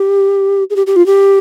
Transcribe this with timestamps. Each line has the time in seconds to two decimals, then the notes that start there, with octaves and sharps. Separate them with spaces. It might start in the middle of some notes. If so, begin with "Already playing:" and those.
Already playing: G4
0.70 G#4
0.76 G4
0.87 G4
0.96 F4
1.06 G4